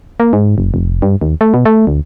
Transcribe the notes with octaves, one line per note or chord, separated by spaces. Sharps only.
A#3
G#2
F#1
F1
G2
D#2
A3
B2
A3
D2